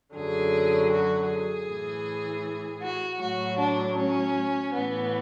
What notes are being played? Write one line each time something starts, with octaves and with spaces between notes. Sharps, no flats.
F#2 D3 F#3 G#4
F#4
G#4
A2 E3
F#4
A2 F#3 F#4
D4
C#4
A2 E3 B3